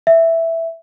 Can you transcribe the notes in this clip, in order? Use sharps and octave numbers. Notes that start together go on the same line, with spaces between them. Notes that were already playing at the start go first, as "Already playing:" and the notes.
E5